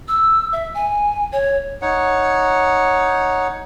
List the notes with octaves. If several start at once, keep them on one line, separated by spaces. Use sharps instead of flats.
E6
E5
G#5
C#5
D#4 C#5 F#5